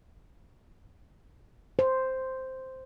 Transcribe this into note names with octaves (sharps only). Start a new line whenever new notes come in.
C5